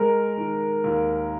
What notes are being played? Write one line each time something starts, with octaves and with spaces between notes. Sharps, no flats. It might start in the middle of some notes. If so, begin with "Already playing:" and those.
Already playing: G#3 A#4
D#3
D#2